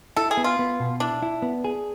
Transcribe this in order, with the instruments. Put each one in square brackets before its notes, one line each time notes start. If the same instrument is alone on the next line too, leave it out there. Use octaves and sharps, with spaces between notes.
[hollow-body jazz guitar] E4 [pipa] A4
[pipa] G#4
[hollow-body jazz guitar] B3
[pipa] F4
[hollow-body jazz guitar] B3
B2
[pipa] D4 [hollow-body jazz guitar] E4
[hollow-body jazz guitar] E4
B3
G#4